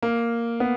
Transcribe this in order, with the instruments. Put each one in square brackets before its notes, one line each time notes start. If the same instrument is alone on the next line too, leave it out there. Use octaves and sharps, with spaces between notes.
[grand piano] A#3
B3